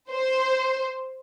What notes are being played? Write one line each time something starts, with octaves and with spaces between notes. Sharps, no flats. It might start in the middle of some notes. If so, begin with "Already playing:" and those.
C5